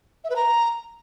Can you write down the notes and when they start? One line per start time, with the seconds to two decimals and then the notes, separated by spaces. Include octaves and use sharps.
0.24 E5
0.30 B4
0.36 A#5